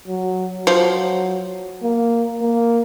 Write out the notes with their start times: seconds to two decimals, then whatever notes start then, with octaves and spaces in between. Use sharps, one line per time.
0.08 F#3
0.67 F3 F#3
1.83 A#3
2.42 A#3